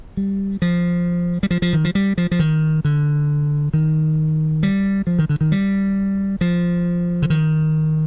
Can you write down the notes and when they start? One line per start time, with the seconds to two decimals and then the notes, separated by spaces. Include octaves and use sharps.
0.17 G3
0.62 F3
1.43 G3
1.51 F3
1.62 F3
1.73 D#3
1.85 F3
1.95 G3
2.18 F3
2.31 F3
2.39 D#3
2.85 D3
3.74 D#3
4.63 G3
5.07 F3
5.19 D#3
5.29 D3
5.41 D#3
5.52 G3
6.41 F3
7.22 D3
7.30 D#3